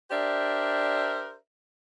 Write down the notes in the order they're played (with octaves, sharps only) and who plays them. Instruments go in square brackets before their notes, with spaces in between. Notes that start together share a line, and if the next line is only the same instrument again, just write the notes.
[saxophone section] D4 G4 A#4 C5 D5 E5